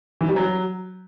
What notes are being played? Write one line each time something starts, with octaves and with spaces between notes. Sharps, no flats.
E3
G3
F#3